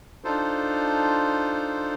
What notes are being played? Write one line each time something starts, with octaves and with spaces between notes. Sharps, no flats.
D4 D#4 F4 A4 C5